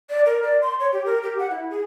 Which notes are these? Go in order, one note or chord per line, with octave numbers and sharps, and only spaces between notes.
D5
A#4
D5
C6
C#5
G4
A#4
G4
F#5
E4
G#4